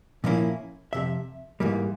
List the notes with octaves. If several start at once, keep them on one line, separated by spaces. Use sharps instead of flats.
A#2 F3 A#3 C#4 E4
F2 C3 E5
G#2 E3 G3 A#3